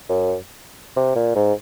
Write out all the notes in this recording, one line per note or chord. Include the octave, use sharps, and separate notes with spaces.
F#2
C3
A#2
G#2